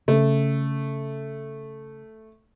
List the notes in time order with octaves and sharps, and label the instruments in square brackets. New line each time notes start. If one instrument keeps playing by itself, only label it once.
[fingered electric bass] C#3 [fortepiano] A3